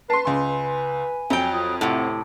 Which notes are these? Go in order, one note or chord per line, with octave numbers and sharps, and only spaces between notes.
B4 A5 C6 C7
C#2 G#5 C6
F2 F#3 G5
F4 D#6
A2 C3 F#5